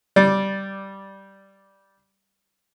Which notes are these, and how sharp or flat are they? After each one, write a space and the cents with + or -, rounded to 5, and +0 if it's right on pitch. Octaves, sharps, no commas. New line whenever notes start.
G3 -10 D5 +0